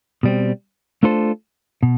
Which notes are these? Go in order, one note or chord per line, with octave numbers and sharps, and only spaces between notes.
B2 G3 C4
A3 D4 F4 A4 C5
B2